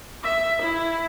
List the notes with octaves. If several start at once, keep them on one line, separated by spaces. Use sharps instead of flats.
E5
E4